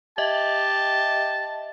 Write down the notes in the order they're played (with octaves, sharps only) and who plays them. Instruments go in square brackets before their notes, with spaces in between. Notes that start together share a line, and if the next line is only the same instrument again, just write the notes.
[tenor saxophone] G4 [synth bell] D#5 E5 [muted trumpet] A5